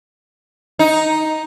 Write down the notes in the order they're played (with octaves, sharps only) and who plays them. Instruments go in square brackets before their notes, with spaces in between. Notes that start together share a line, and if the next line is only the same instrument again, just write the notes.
[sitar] D#4